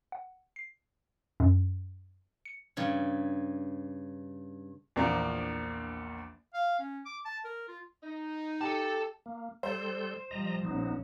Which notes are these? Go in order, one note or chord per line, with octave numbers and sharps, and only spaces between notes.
F#5
C7
F#2
C#7
G2 C#3
A#1 E2 F3 A#3 D4 A#5
F5
C#4
D6
A5
A#4
F4
D#4
G4 A4 A5
A#3
G3 A4 C5 G6
F3 G3 D#5 A#5
A#1 B3 C#4 D#4